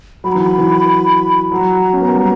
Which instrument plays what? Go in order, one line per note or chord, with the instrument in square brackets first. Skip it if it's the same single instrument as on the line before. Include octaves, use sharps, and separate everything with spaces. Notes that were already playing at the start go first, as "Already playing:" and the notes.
[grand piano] F#3 [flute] B5
[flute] A#5
[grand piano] E3 [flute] B5
[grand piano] E3
[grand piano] F#3 [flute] A#5
[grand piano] C#4
B3
A#3
G3